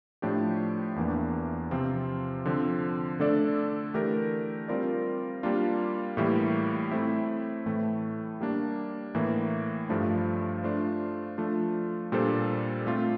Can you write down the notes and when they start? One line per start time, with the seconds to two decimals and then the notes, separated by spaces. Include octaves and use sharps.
0.22 A2 F3 A3 D4 G4
0.96 E2 E3 A#3 D4
1.71 C3 F3 C4 F4
2.45 D3 F3 C4
3.20 D3 A3 D4 A4 D5
3.94 E3 A3 D4 G4 A#4
4.68 G3 C4 F4 A#4 D5
5.43 G3 A#3 D4 F4
6.17 A2 E3 G3 A#3
6.91 A3 C4 E4
7.66 A2 E3 A3
8.41 G3 A#3 D4
9.15 A2 E3 A#3
9.89 G2 F3 A3 D4
10.63 A3 D4 F4 C5
11.38 F3 A3 D4 F4
12.12 A#2 G3 D4 A4 C5
12.87 A3 C4 F4